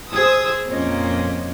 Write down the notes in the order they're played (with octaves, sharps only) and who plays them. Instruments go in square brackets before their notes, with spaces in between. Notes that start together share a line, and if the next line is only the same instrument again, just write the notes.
[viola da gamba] G#4 [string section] C5 D#6 E6
[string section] F2 A#2 D#5 [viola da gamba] A#3 C4 C#4